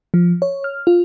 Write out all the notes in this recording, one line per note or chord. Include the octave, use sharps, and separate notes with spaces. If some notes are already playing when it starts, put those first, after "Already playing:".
F3
C#5
F6
F4